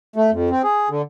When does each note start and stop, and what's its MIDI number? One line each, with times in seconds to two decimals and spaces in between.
0.16 0.31 57
0.31 0.50 41
0.50 0.62 60
0.64 0.89 68
0.89 1.02 50